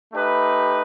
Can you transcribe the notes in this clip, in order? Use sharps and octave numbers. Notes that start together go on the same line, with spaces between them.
A3 D#4 G4 B4 E5